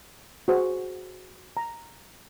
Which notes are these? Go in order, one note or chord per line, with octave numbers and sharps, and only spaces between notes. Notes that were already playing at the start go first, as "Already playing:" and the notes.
F#4 G#4 C5
A#5